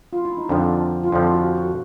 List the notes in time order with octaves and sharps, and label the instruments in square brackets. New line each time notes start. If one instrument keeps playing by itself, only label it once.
[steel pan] F4
E4
D#4
[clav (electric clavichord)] F2 D3 F3 [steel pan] D4
[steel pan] F4
[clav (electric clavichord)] F2 D3 F3 [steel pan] E4
[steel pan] F#4
F#4